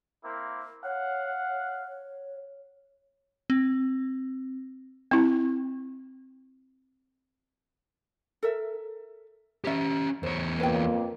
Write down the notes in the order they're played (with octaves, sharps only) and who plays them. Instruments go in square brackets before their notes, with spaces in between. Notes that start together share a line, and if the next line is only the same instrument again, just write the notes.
[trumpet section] A#3 C4 E4
[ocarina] C#5 [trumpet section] F5 F#5
[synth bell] C4
[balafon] C4 E4
[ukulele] A4 A#4 E5
[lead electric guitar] C#4 G4 [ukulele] C#5 E5
[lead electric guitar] E2 C#5 [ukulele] C5
[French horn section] F2 A#3 [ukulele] B4 G5